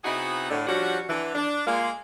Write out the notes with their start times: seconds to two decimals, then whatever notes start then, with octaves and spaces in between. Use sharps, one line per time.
0.04 C3 B3 D#4 E4 F#4 G#4
0.50 A2 D3
0.67 F3 G3 C#4 D4 F#4
1.09 D3 E3
1.35 D4
1.66 G#3 A#3 F4